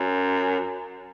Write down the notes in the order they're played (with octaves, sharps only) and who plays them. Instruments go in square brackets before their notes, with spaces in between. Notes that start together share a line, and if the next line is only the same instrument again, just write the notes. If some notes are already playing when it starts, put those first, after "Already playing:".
Already playing: [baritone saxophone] F#2